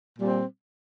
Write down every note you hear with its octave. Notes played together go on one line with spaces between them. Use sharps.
A#2 G3 C4